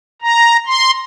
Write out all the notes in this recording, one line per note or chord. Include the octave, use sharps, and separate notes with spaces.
A#5
C6